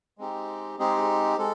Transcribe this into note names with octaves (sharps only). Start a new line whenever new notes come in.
G#3 C4 D#4 G4
G#3 C4 D#4 G4 G#4
G#3 A4